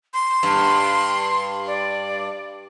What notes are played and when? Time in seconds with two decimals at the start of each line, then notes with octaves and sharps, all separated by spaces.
0.14 C6
0.43 G2
1.67 D5